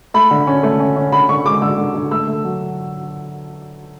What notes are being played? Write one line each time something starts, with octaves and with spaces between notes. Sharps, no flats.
A3 B5
D3
C#4
A3
C#4
C#4
D3 B5
D3 C#6
G#3 D6
D3 E6
D3
D3
A3 E6
A3
F#3